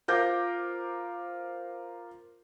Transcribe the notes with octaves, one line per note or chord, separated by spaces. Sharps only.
F4 A#4 C5 D6 G6 A#6